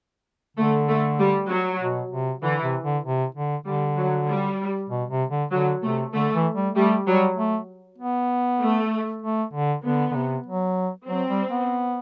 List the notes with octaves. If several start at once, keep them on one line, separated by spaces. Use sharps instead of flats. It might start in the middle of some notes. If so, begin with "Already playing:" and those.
D3 A3
A3
G3
F#3
B2
C3
D3 E3
C3
D3
C3
D3
D3 G3
F#3
G3
B2
C3
D3
D3 F#3
C3 A3
D3 A3
E3
G3
G3 A3
F#3 G3
A3
B3
A3
A3
D3
D3 B3
D3
C3
F#3
F#3 C4
G3
B3